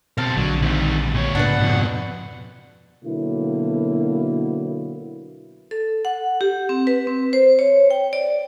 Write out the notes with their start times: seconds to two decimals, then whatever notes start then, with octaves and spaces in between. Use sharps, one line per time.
0.18 B2 C4 A#4 F5 A5
0.37 A#1 D3 F#3
0.62 D2 D#3 G3 C4
1.14 A#2 C#5
1.35 G#2 C#3 B3 D4 B4 F#5
1.61 F2 B2
3.05 B2 D3 F#3 A#3 B3 E4
5.71 A4
6.05 F#5
6.41 G4
6.69 C4
6.87 B4
7.07 C4
7.33 C5
7.59 C#5
7.91 G5
8.13 D5